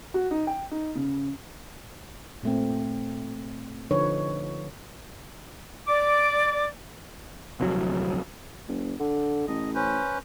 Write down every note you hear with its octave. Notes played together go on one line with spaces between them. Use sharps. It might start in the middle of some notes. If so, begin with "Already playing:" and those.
F#4
D#4
G5
D#4
C#3
A#2 A3 C4
D3 F3 D#4 B4 C#5
D5 D6
D1 C2 F2 F#3
F#1
D3
A1 D#5
C#4 B4 C5